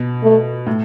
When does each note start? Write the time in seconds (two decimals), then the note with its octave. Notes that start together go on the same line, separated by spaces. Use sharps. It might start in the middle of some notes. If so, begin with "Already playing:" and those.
Already playing: B2
0.23 A3
0.67 A2